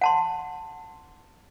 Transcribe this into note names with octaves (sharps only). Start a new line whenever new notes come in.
F#5 A5 C6